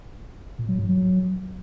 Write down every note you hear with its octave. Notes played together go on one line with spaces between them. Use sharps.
A#2
F#3
G#2
F#3